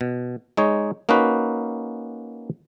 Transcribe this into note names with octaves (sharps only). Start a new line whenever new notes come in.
B2
G#3 D#4 C#5
A#3 C#4 D#4 F#4 B4